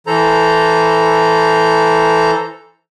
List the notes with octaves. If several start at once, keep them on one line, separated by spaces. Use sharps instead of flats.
E3 A4 C5 A#5